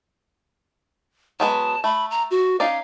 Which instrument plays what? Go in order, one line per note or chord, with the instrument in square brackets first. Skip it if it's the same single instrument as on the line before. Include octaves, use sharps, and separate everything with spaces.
[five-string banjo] F#3 G#3 B3 [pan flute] A5
[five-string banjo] A3 [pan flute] B5
[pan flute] A#5
F#4
[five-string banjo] C#4 D#4 D5 [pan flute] F5